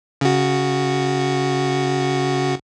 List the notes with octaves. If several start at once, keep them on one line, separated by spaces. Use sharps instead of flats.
C#3 F#4